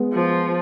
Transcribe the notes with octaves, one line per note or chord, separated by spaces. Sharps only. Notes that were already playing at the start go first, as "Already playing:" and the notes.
Already playing: G#3 B3
F3